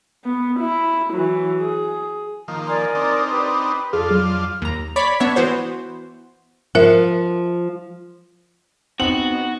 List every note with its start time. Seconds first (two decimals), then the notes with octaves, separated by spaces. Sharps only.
0.25 B3
0.59 E4
1.13 E3 F#3
1.61 G#4
2.48 D#3 F3 A#3
2.67 A#4 D5 G#5 C6
2.95 C4 D4 D#4
3.31 G4 B4
3.93 F2 D4 F4 G#4 A4
4.11 F#3 F6
4.62 D#2 A#5
4.96 C#5 D5 B5 B6
5.20 B3 D4 C#5 E5
5.36 E3 B3 F#4 C5
6.75 F3 A#4 E5
9.00 B3 C4 D#4 F#4 F#7